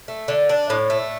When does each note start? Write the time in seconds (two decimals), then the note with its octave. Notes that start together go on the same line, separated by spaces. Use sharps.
0.08 A3
0.28 D3
0.49 D4
0.70 A2
0.90 A3